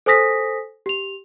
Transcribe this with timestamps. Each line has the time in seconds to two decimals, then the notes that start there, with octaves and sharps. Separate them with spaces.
0.06 A4 C5 G#5 D#6 A#6 B6
0.86 G4 F7